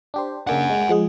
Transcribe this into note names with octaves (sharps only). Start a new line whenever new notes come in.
D4 G4 C5
C#3 A#3 D4 F#5 G#5
G#3
F3 G#3 G#4